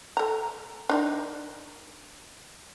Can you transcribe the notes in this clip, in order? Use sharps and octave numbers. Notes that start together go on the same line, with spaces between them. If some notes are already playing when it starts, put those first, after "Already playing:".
A4 A#5
D4 D#4 A#4